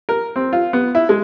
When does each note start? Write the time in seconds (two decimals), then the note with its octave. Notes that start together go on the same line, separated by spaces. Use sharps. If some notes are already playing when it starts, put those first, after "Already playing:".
0.09 A#4
0.36 C4
0.53 F4
0.73 B3
0.95 E4
1.09 G#3